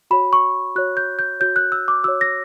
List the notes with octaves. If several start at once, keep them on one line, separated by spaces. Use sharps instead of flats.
F#4 C#5 B5
C#6
F#4 C#5 F#6
G6
G6
F#4 C#5 G6
F#6
E6
D6
F#4 C#5 E6
A#6